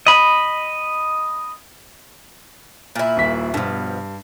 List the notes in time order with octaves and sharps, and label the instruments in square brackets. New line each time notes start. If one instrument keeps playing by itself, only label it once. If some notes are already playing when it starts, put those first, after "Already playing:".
[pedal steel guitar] D#5 B5
[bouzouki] A#2 E4
[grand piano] D#1 B6
[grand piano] G2 [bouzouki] B2 F3